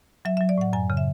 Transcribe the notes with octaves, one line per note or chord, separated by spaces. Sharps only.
F#3 E5
F#3 E5
D5
A2 F#5
F#2 G#5
C#3
E5